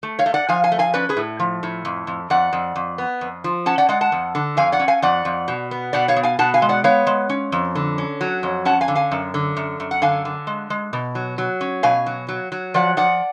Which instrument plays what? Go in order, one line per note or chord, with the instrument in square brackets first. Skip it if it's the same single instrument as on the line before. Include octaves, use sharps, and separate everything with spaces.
[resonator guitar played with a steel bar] A3
C#5 F5
A3
D5 F#5
F3 F5 G#5
F5 G#5
A3
F5 G#5
C#4 B4 D5
G#4 B4
A2
F3
A2
F2
F2
F2 D5 F#5
F2
F2
B3
F2
F3
C#4 F#5 A5
D5 F#5
G#3 D5 F#5
F#5 A5
F2
D3
F2 F5 G#5
D5 F#5
C#4
F5 G#5
F2 D5 F#5
F2
B2
B3
B2 D5 F#5
C#5 F5
B3
F5 G#5
B2 F#5 A5
F5 G#5
G#3
D5 F#5
B3 C#5 F5
G#3
C#4
F2
D3
C#4
F#3
F2
C#4 F#5 A5
F5 G#5
D3
F5 G#5
F#2
D3
F#2
F#2
F#5
D3 F5 G#5
D3
G#3
G#3
B2
F#3
F#3
C#4
B2 F5 G#5
F#3
F#3
F#3
F3 D5 F#5
F3 D5 F#5